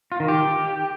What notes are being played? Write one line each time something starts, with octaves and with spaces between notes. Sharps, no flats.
F4
D#3
G4